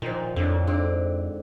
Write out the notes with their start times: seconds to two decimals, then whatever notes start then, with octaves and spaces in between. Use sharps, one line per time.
0.02 A#2 D#3 F3
0.36 F2 A2 D3
0.67 G#2 D3 C4